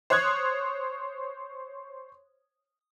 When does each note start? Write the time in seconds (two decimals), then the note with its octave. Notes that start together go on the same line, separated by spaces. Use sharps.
0.10 C5 C#5 D#6 F#6 G#6